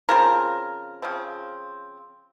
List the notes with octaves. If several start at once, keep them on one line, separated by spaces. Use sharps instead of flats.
C#3 F3 C4 A#4
C#3 F3 C4